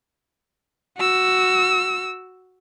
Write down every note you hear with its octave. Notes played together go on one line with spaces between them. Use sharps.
F#4 E6